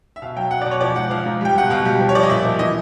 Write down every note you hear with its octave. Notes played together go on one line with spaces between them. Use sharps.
E5
B2 F5
F#3 G5
F#3 F#5
D5
B2
C#5
F3 D5
G#2 F#5
F3 F5
G#2
G3 G5
B2 F#5
B2 F5
G3
F3
C#5
F3 D5
D#5
A#2 E5
F3
E3 D#5